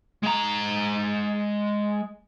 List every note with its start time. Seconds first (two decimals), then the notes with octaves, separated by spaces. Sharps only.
0.23 G#3 A#5